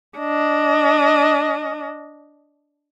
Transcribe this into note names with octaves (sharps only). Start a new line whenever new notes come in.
D4 D#5